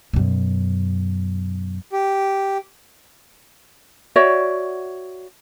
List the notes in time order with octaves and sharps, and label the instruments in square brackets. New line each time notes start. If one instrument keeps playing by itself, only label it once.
[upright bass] F#2 B2
[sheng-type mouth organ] G4
[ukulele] F#4 C#5 D5 E5